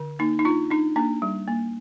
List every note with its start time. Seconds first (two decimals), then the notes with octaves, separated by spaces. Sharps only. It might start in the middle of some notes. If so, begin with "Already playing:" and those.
Already playing: D3
0.19 A#3 D#4
0.39 D#4
0.45 D4 F4
0.70 D4 D#4
0.96 A#3 D4
1.22 G3
1.48 A#3